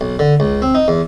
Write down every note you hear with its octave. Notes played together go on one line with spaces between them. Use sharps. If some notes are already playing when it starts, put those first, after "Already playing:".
B1
D3
C#2
C4
D#4
E2